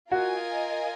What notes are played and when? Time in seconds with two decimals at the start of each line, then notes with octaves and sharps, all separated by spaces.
0.11 F4 F#4 A#4 D#5 G#5